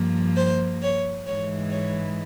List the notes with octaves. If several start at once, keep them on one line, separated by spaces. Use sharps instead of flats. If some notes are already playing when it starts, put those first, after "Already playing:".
Already playing: G2 F3 A#3
C5
C#5
G#2 E3 G#3 C#5
C#5